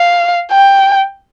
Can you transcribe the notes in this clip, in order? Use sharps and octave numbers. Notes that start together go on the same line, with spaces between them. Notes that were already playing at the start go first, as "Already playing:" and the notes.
Already playing: F5
G5